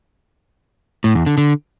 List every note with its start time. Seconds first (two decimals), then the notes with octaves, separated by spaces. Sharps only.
1.04 A2
1.15 E2
1.26 D3
1.38 D3